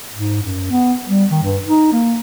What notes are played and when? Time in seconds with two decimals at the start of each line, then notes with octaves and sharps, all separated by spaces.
0.13 G#2
0.42 F#2
0.71 B3
1.08 G3
1.31 D#3
1.43 G2
1.66 D#4
1.93 A#3